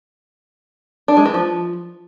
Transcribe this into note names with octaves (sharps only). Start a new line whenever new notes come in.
D4
G#3
E3
F3